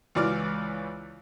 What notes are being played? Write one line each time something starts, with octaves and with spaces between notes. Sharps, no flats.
C#2 E3 F4 D5 F6